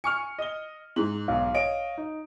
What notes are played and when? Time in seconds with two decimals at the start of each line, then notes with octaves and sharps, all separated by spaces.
0.04 G#5 C#6 F6 C#7
0.39 D#5 G7
0.96 G#2 F#7
1.28 B1 F5
1.54 C#5 D#5 D7
1.98 D#4